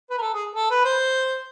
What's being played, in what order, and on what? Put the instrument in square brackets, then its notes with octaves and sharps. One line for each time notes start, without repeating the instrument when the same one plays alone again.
[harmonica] B4
A#4
A4
G#4
A4
B4
C5